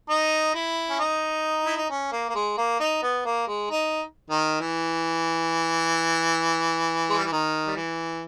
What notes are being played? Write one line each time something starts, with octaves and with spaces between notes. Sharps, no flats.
D#4
E4
C#4
D#4
E4
D#4
C#4
A#3
A#3
G#3
A#3
D#4
B3
A#3
G#3
D#4
D#3
E3
G#3
G3
E3
D#3
G3
E3